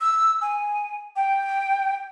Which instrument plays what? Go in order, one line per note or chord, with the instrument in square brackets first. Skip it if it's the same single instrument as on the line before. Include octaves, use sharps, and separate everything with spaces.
[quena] E6
G#5
G5